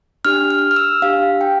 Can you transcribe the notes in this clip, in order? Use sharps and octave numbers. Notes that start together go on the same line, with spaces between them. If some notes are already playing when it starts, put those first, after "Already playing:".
D4 G4 F6
F6
F6
E6
D4 G4 F5
G5